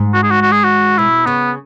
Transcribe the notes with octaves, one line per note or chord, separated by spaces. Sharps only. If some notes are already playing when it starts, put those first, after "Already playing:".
Already playing: G#2
F#4
G#4
F#4
F#4
G#4
F#4
B2 E4
C#3 B3